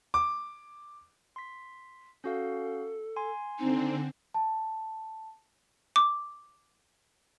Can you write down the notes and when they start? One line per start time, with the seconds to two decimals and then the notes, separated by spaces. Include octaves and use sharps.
0.14 D6
1.36 C6 B6
2.24 C#4 F#4 A4 F5
3.16 G#5 C6
3.58 D3 C4 D#4
4.34 A5
5.96 D6